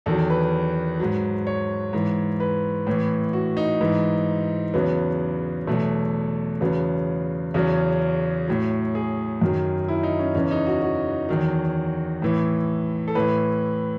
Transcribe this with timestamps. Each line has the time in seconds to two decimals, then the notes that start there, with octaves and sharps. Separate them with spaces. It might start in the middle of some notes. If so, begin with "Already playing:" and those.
0.06 E2 D#3 F#3 A4
0.30 B4
1.00 G#2 F#3
1.47 C#5
1.93 G#2 E3
2.40 B4
2.87 A2 E3
3.33 F#4
3.57 D#4
3.81 G#2 E3
4.74 E2 C#3 F#3 B3
5.67 E2 B2 F#3 A3
6.61 E2 C#3 F#3 B3
7.54 E2 C#3 F#3 C#4
8.48 A2 F#3
8.95 G#4
9.42 F#2 D#3 F#3
9.88 E4
10.03 D#4
10.19 C#4
10.35 E2 C#3 E3 C#4
10.51 D#4
10.67 F#4
10.82 F#4
11.29 E2 D#3 F#3
12.22 A2 E3
13.08 A4
13.15 A2 E3 B4